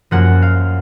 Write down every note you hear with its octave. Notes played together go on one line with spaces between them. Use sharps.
F#2 F3 A#3 F#5
F5